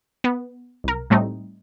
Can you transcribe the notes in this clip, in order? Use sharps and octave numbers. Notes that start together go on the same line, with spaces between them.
B3
C2 A#4
A2 G3 A3 C4 D#4